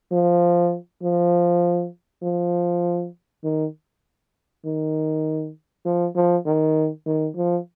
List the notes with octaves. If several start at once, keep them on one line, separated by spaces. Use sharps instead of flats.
F3
F3
F3
D#3
D#3
F3
F3
D#3
D#3
F3